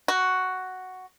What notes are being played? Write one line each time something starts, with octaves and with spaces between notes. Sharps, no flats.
F#4